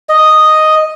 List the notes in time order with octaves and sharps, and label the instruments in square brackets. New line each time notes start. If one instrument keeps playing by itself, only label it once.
[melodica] D#5